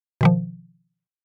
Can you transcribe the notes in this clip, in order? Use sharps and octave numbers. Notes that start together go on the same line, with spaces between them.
B2 D#3 F3